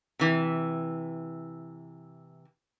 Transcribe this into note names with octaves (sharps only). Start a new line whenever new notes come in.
C3 E3